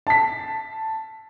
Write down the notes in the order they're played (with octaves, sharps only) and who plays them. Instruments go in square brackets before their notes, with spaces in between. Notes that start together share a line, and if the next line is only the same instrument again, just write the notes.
[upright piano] A5 B6